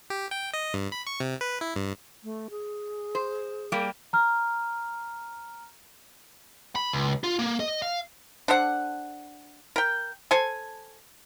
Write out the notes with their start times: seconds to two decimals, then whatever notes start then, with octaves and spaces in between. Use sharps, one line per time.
0.10 G4
0.31 G5
0.54 D#5
0.74 G2
0.92 B5
1.07 C#6
1.20 C3
1.41 B4
1.61 E4
1.76 G2
2.23 A3
2.50 G#4
3.15 C5
3.72 G3 A#3 G4
4.13 A#5 F6
6.76 B5
6.93 C#2
7.24 F4
7.39 A#3
7.60 D#5
7.82 F5
8.48 D4 A4 C5 F#5
9.76 A#4 G5
10.31 A4 C5 G#5